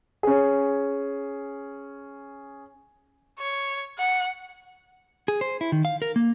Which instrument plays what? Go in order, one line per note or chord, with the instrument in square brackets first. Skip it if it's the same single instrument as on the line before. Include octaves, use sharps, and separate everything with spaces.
[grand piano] C#4 G#4
[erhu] C#5
F#5
[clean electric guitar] G#4
C5
E4
D#3
F5
A#4
A#3